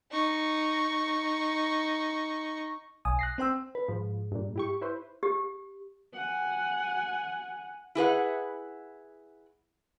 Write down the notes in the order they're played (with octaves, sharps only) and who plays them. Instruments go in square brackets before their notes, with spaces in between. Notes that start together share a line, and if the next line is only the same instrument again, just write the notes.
[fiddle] D#4 C#6
[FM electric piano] B1 G#5 D#6
F#6 A#6 C7
C4 C5 G5 E6
[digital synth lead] B4
[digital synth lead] G#2 [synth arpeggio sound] F3
[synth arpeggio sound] G2 A#2
E4 G4 C#6
E4 B4 C5
[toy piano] G4
[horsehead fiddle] F#5 G#5
[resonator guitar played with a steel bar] E4 G#4 B4 F#5